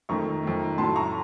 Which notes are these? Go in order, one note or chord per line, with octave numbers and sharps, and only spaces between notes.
F2 D#3 A3 A#5 C#6
F2 D#3 A3
A2 F#3 A3 A5 C6
A#5 C#6